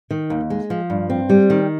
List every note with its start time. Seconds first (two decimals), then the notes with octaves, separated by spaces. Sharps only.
0.11 D#3
0.30 D#2
0.50 G#3
0.70 F3
0.90 G2
1.10 C4
1.30 G3
1.50 D#3